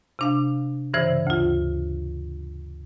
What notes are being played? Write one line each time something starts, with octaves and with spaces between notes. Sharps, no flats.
C3 D4 F5
G2 C#3 E3 C5 D5 E6
D2 F4